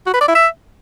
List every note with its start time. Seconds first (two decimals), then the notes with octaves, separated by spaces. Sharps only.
0.07 F#4
0.14 B4
0.21 D5
0.28 E4
0.35 E5